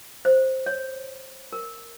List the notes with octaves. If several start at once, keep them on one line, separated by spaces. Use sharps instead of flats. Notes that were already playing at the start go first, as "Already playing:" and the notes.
C5
C#5
A#4